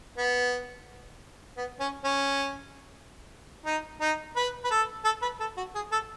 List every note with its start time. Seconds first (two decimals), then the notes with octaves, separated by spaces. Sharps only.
0.18 B3
1.57 B3
1.80 C#4
2.04 C#4
3.65 D#4
4.01 D#4
4.36 B4
4.64 B4
4.71 A4
5.04 A4
5.22 B4
5.40 A4
5.57 F#4
5.75 G#4
5.92 A4